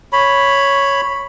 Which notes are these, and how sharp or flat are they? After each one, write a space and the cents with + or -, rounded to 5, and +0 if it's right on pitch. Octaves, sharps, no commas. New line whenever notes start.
C#5 +0 B5 +0